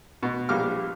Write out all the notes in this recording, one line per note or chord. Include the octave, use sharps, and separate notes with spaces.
B2
A#1 G3 A#3 D6 F6